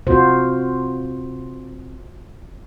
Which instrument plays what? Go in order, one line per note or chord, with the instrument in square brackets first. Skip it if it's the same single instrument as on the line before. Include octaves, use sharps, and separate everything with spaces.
[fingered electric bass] C3 C4 [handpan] F4 F#4 C5